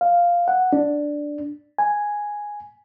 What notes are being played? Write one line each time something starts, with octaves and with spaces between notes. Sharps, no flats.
F5
F#5
D4
G#5